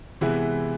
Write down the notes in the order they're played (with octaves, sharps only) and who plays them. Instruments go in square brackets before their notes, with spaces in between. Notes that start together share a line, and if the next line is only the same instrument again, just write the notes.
[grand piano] C3 E3 G#3 B3 E4